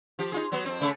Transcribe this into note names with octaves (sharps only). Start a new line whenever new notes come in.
F3 G4
D#4 F4 G#4
F#3 B3
F2 C4
C#3 A3